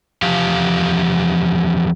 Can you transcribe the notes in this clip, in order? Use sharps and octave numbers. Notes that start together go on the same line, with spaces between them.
E2 F3 G4 F5